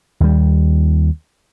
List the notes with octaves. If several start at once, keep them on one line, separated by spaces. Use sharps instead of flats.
D#2 G3